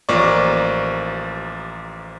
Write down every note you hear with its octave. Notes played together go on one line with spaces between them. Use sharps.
A1 F3 A#3 D5 C#6